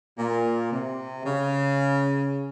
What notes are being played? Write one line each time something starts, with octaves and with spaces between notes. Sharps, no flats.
A#2
C3
C#3